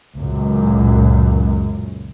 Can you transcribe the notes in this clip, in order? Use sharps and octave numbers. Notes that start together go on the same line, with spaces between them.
C#2 F#2 A#2